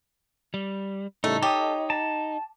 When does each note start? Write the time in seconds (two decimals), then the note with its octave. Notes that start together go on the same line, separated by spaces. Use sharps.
0.54 G3
1.24 A2 C#3 G3 A3 D#4
1.43 G4 A4 C#5 D#5 D#6
1.90 A5 A#5